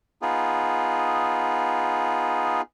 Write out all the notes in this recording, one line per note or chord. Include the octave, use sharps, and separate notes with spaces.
B3 D#4 F4 G#4